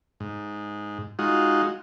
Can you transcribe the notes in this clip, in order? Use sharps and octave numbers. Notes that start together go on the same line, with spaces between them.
G#2
G#3 D#4 F4 F#4